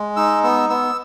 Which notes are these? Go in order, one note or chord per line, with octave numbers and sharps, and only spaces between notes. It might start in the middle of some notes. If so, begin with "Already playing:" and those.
Already playing: G#3
D#4 E6
B3 E6
B3 E6